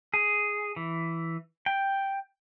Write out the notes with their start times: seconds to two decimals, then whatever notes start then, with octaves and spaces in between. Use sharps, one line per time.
0.14 G#4
0.76 E3
1.66 G5